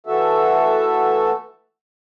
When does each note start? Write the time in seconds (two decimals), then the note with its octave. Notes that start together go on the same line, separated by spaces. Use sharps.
0.07 E3 A3 F#4 A4 E5